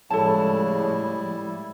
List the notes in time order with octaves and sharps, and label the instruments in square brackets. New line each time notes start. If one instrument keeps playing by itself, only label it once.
[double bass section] A2 F3 G#3 [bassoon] C#3 [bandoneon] G3 E4 [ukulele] A4 A5